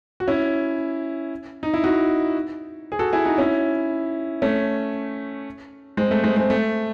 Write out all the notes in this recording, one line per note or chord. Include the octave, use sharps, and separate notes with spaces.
F#4
C#4 E4
D#4
E4
D#4 F#4
G#4
F#4 A4
E4 G#4
D#4 F#4
C#4 E4
A3 C#4
G#3 C4
A3
G#3 C4
G#3 C4
A3